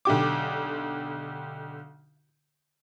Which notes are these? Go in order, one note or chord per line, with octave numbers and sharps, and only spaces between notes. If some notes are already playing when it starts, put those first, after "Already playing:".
B1 D3 G4 D6